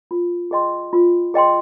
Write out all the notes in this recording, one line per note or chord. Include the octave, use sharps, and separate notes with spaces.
F4
G#4 D#5 G5 C6
F4
G#4 D#5 G5 C6